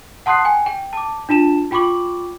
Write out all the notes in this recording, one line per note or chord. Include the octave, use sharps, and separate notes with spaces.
F#5 A5 C6 D#6 F#6 C7
G5 G#5
G5
A5 D6
D4 F4 A5 E7
F4 G5 B5 C#6 D6 F#7